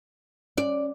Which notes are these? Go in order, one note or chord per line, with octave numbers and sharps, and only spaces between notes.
C#4 D5